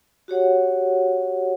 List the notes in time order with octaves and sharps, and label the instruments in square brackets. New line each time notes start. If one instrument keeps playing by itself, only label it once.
[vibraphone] F#4 G4 C#5 F#5